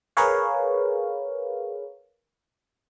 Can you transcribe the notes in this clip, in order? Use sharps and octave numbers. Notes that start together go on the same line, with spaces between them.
G#4 A#4 B4 C#5 F5